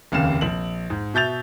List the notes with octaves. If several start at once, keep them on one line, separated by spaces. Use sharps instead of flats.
F1 D#2 C#3 F5 E7
A#1 F#7
G#2
B2 E5 G6 A6 F7